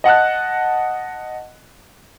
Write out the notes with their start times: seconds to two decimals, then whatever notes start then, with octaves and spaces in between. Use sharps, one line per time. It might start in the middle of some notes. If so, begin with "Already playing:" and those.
0.04 D#5 F#5 A5 F#6